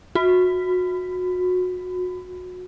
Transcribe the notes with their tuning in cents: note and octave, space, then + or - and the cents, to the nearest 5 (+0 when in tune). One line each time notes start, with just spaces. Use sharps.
F#4 -25